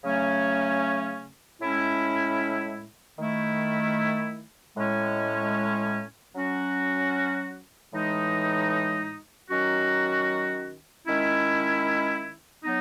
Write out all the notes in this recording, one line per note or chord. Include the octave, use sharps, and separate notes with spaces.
C#3 F#3 A3 C#4
A2 G#3 C#4 E4
D#3 A3 E4
A2 G#3 C#4
F#3 C#4 F#4
A2 E3 G#3 D#4
D#3 F#3 C#4 F#4
D#3 G#3 C#4 E4
F#3 B3 D#4